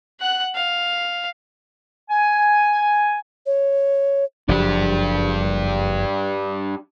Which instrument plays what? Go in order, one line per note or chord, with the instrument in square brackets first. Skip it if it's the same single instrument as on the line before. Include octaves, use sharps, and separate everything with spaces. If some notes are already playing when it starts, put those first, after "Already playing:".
[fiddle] F#5 F#6
F5
[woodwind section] G#5
[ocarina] C#5
[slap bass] F#1 F3 [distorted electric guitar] D4 G4